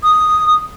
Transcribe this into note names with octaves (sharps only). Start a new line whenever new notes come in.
D#6